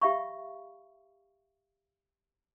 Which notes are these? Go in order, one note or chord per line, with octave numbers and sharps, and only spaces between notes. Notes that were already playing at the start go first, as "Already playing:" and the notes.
G4 E5 F5 B5 C#6